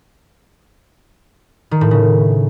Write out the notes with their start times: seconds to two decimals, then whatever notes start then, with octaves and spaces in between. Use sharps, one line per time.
1.71 D#3
1.81 A2
1.91 C#3